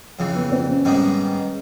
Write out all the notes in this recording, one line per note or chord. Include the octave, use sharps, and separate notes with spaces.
F2 C#3 E3
B3
C4
C#4
G#2 D#3 G3 B3 C#4 D#4